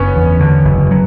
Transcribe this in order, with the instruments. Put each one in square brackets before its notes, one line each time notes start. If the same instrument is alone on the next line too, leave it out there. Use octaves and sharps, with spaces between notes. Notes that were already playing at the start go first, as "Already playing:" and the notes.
Already playing: [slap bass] F#1 [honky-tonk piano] B3 C#4
[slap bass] E2
D3
F#1
F#3